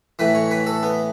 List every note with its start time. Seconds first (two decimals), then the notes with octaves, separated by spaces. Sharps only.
0.19 A2 E3 B4
0.35 C#5
0.51 B4
0.67 A4
0.83 B3